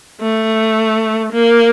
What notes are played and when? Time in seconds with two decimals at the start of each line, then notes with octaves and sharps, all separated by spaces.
0.21 A3
1.32 A#3